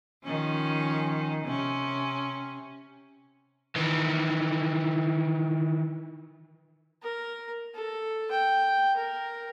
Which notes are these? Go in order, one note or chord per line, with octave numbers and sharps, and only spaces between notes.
D#3 F3 C#4
C3 C#4
D#3 E3
A#4
A4
G5
A#4